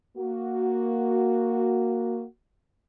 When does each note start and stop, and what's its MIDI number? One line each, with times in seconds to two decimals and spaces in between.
0.16 2.24 58
0.16 2.24 66